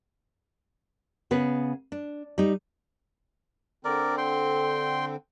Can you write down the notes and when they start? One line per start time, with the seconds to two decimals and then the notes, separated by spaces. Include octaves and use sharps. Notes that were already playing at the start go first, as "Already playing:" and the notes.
1.31 C#3 B3 B4
1.92 D4
2.38 G3 D#4
3.85 D3 C4 A#4 D5
4.18 G5 C6